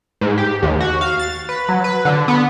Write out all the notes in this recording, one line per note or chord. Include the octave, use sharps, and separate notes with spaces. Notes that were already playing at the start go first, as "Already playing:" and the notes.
G#2
G4
D#2
F#4
F5
A6
B4
F#3
B4
D3
B3